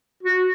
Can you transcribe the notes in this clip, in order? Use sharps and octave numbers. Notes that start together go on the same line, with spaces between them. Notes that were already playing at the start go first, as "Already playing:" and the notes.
F#4